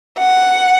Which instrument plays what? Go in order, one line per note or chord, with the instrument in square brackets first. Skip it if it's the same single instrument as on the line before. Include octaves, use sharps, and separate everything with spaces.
[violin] F#5